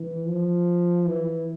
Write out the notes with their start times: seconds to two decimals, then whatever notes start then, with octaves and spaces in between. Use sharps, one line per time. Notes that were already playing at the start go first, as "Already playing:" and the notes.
Already playing: E3
0.26 F3
1.06 E3